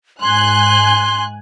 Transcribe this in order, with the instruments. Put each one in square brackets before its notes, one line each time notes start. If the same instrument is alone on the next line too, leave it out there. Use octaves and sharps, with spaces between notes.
[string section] G#2 G#5 F#6 [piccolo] C6